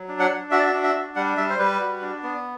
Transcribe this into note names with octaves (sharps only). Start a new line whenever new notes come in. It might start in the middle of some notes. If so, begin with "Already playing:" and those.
Already playing: F#3
D4
F#5
D4
F#4 E5
D5
E5
D4
E5
D4
G3 F#5
G3 E5
C5
G3 B4
F#4
D4
B3